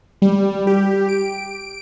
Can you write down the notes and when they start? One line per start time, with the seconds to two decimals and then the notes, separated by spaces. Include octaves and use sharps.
0.22 G3
0.67 G4
1.09 D7